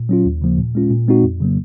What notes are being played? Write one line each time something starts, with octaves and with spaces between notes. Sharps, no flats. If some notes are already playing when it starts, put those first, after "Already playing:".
Already playing: A#2
F#3 C#4 F4
D#2
C#3 F3 A#3
A#2
G#3 C#4 F4
A#2
G#3 C4 D#4 F#4
F2
C#3 F#3 A#3